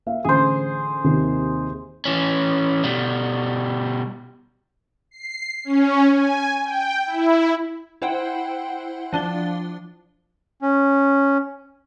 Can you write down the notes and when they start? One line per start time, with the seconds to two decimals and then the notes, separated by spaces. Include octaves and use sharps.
0.06 A#3 E5 F5
0.25 A1 D3 G#4 C5
1.04 D#2 C3 D#3
2.05 E3 C#4
2.84 B2 G3
5.11 C7
5.65 C#4
6.11 G#5
6.64 G5
7.06 E4
8.02 E4 C5 F#5 G5
9.13 F3 D4 A6 G7
10.62 C#4